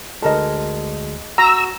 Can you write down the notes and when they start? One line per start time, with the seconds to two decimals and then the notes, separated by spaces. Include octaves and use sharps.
0.22 D2 G#3 A4 A#4 D#5
1.38 F#4 A#5 E6